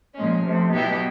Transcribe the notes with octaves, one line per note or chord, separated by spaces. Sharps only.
A#2 F3 G#3 C#4
C3 F3 A3
B2 F#3 B3 E4 G4